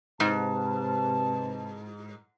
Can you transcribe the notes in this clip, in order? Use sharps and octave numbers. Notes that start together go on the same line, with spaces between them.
G#2 C3 B4 A5